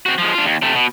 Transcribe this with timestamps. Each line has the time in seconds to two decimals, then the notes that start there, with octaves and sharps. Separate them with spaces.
0.06 C4 F#4
0.18 F3 G#3
0.34 D4 F4
0.45 D#2
0.62 C3 A3
0.75 B2